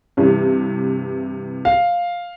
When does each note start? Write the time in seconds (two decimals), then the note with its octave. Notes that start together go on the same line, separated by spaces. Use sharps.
0.17 G2 C3 E3
1.65 F5